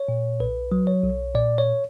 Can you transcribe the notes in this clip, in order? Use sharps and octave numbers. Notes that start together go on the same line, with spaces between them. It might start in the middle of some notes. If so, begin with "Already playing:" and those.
Already playing: C#5
A#2
B1 B4
F#3
C#5
B1
A#2 D5
C#5